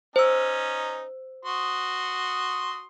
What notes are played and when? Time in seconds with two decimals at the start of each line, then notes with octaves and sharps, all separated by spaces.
0.16 C#4 D#4 C5 E6
1.45 F#4 C6 D#6